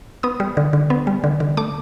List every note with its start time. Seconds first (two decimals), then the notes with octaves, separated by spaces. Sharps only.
0.23 B3 D#6
0.40 G3
0.57 D3
0.73 D3
0.90 B3
1.07 G3
1.24 D3
1.40 D3
1.57 A3 D6